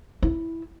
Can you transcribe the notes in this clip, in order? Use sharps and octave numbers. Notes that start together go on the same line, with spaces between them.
E4